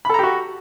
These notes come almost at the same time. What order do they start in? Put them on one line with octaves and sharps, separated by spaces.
B5 A4 A#5 G4 F#4